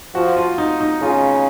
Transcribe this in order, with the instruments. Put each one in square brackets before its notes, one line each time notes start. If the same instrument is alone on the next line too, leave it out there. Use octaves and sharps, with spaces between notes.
[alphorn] F3 [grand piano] F#4
[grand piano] F4
D#4
D#4
[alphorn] C#3 [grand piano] F4